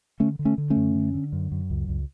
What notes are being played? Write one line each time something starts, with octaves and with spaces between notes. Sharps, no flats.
D3 A3 C#4
D3
A3 C#4
D3
A3 C#4
F#2
D3
D3
F#2
F#2
C#2
C#2